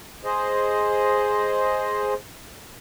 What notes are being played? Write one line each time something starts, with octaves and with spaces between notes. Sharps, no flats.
G#4 C5 D#5